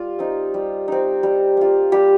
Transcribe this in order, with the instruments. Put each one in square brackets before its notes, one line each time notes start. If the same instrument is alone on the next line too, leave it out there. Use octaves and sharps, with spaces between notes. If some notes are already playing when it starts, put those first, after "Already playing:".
Already playing: [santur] G3 F4
C4 D#4
G3
C4 D#4
G3
A#3 F4
G3 G4